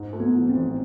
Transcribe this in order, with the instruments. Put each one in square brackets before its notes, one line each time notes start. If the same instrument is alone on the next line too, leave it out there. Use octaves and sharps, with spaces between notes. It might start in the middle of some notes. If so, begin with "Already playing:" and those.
Already playing: [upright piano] G#2
A3
[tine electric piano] B3
[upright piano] E3
[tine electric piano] C4
[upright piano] A1